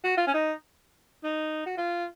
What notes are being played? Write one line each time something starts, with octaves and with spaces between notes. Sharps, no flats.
F#4
F4
C#4
D#4
D#4
F#4
F4